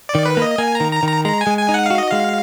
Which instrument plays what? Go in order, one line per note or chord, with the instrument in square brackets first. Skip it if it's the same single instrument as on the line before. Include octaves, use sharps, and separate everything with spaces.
[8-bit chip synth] D5
[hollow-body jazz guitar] D#3
[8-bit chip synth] B4
[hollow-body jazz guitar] A#3 [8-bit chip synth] D#5
[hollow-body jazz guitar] A#3 [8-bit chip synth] G#5
[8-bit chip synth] A#5
[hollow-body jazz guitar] D#3
[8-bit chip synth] A#5
[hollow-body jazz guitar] D#3
[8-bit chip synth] A#5
[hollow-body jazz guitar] G#3 [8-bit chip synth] A#5
[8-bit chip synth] G#5
[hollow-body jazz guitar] G#3
[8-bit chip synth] G#5
[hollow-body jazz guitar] D#4
[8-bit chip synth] F#5
[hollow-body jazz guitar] F#4 [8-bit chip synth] F5
[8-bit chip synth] D#5
[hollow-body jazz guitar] G#3 [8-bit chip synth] F5